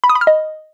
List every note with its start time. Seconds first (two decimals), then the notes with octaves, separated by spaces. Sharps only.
0.04 B5
0.09 D#6
0.15 B5
0.21 F6
0.27 D#5